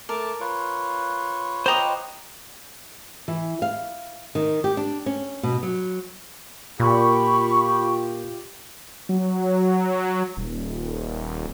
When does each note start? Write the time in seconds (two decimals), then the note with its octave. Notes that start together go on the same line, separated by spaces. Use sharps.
0.09 A3 A#4 A5 D6
0.40 F4 B4 C#5
1.66 C5 D#5 G5 A#5 D6
3.28 E3
3.62 F5
4.35 D#3
4.64 G4
4.77 D4
5.06 C#4
5.43 B2
5.63 F#3
6.80 A#2 F4 G4 B5 C#6
9.09 F#3
10.37 D#1